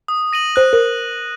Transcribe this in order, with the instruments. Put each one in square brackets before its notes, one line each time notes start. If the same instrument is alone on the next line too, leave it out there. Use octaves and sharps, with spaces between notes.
[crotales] D#6
A#6 D#7 F#7
[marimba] C5 [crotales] F#6
[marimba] A#4